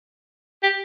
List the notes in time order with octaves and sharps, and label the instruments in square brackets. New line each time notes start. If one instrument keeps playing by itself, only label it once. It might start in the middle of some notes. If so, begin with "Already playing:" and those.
[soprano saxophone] G4